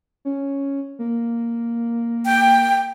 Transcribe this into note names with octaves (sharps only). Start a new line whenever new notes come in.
C#4
A#3
G5